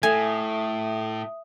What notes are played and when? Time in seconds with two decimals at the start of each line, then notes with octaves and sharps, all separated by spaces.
0.03 A2 A3 E5 G#5 D#6